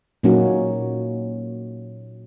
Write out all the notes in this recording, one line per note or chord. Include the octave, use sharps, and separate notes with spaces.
A#2 F#3 A#3 C#4 D#4 F#4